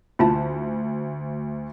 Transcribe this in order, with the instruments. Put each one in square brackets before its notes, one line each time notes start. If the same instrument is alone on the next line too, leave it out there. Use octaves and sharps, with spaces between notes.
[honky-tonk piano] D2 [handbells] E4 F4 A5